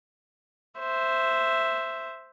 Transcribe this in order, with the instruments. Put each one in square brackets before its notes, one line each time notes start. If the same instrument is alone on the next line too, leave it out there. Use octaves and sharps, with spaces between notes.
[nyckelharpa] C5 E5